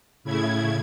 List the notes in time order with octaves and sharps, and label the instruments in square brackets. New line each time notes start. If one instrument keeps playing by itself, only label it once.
[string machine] A2 C#3 E4 G#6